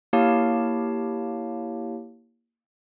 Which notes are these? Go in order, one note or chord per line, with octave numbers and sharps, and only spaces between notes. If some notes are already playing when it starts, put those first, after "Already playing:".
A#3 E4 G4 C#5 F5 A5